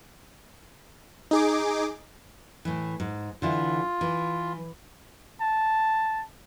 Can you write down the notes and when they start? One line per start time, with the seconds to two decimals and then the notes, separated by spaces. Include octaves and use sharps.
1.31 D#4 G#4 D6
2.65 A2 E3
3.00 G#2
3.42 D3 E3 E4 F4
4.01 E3
5.41 A5